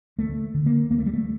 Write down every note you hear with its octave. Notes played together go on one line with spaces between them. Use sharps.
D2 A3
D3
A#3
D2 A#3
A3
G3
A3